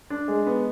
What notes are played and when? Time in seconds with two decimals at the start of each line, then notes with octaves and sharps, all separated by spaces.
0.10 D4
0.28 G#3
0.46 B3